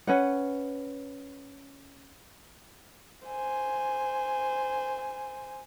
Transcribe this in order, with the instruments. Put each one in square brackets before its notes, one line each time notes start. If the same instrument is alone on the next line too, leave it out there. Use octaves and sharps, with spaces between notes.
[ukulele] C#4 B4 F#5
[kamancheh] C5 G#5